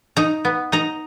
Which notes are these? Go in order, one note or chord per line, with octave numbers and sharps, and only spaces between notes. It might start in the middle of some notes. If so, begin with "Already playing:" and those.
D#4 A#5
B3
D#4 A#5